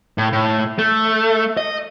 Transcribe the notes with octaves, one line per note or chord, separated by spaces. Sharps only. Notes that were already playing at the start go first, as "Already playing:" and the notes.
A2
A2
A3
D#5